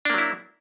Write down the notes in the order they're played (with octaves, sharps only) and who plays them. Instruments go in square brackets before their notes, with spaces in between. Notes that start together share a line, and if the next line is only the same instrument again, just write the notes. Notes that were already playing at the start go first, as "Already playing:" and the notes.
[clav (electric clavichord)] D4
A#3
F#3
E4